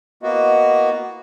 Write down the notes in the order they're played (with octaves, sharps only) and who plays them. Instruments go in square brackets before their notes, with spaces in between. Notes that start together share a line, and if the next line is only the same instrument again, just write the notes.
[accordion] A#3 B3 F#4 [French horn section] E4 D#5